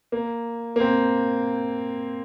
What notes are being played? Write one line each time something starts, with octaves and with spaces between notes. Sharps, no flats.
A#3
A#3
C4